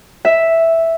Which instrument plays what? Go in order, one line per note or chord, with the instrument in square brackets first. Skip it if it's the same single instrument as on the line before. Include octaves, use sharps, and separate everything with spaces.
[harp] E5